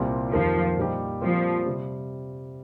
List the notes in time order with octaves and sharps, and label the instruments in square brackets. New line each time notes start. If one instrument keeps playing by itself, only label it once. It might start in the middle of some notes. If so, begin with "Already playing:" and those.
Already playing: [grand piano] C2 A#2 G3 C4 G4
[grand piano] F2 D#3 A#3 G4 A#4 [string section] F3
[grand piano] A#2 G3 D#4 G4
[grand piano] A#2 G3 C4 F4 A#4 [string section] F3
[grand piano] C3 G3